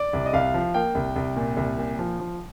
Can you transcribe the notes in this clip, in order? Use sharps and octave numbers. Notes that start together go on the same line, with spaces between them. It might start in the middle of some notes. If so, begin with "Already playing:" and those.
Already playing: D5
C2
D#5
C2 F5
F3
A#3 G5
C2
C2
A#2
C2
A#2
F3
F3